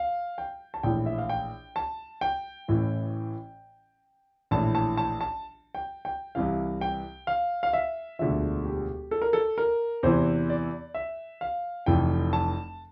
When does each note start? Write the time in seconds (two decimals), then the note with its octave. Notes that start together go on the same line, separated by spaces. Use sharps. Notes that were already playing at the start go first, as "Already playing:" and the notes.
Already playing: F5
0.38 G5
0.74 A5
0.83 A#1 A2 E3 G5
1.06 E5
1.18 F5
1.29 G5
1.76 A5
2.21 G5
2.68 A1 A2 E3
4.51 A#1 A2 E3 A5
4.75 A5
4.97 A5
5.21 A5
5.75 G5
6.05 G5
6.35 C2 C3 E3 F5
6.81 G5
7.27 F5
7.63 F5
7.73 E5
8.19 E1 D2 D3 F3 E5
8.65 G4
9.11 A4
9.22 A#4
9.33 A4
9.58 A#4
10.03 E2 C3 E3 C5
10.50 D5
10.94 E5
11.41 F5
11.86 F1 F2 E3 G5
12.33 A5